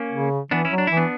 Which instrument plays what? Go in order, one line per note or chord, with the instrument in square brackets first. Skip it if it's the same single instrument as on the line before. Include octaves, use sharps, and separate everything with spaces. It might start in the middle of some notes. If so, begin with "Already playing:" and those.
Already playing: [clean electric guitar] A#3 C#4
[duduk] C#3
[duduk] E3 [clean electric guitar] B3 D4
[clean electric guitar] C#4 E4
[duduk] F#3
[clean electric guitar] D4
[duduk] E3 [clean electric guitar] E4
[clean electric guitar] B3 D4